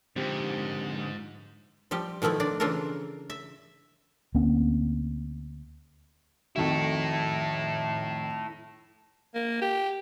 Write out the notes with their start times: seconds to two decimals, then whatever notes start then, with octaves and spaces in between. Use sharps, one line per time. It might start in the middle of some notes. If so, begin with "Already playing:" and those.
0.16 G#2 D3 F3 C4 G4
1.91 F3 G3 G4
2.22 B2 D#3 F3 A3 E4
2.40 D4 D5
2.60 C#3 E3 D4 F4 A4 A#4
3.30 E5
4.35 D2 A#3 C4 C#4
6.56 F2 D#3 E4 F#4 A4
9.34 A#3
9.61 G4